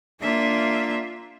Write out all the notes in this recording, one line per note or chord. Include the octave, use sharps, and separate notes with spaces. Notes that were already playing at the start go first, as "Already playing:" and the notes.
A#3 D4 F4 E5